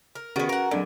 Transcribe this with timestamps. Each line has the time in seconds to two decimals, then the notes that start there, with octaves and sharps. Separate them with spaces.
0.15 A#4
0.36 D#3 B3 C#4 F#4 G#4 B4
0.49 A#4 F#5
0.71 A#2 D3 F#3 D4 D7